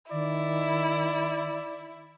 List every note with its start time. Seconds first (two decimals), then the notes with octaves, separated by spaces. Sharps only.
0.12 D#3 E4 D5